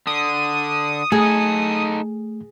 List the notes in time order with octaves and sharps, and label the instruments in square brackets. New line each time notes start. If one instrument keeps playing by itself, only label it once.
[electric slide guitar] D3 [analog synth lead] D#6
[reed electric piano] A3 [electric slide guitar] D#4 A4 [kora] G#4